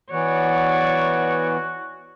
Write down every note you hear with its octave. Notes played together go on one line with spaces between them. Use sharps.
E3 B3 F#4 C#5 D5